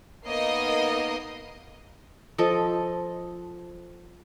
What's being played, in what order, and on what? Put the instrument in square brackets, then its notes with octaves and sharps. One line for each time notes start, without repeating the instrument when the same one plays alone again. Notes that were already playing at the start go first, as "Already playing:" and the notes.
[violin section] A#3 B3 D#4 D#5 C7
[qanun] F3 A4 D#5